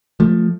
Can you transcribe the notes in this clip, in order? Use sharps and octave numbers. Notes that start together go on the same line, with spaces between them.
F3 A3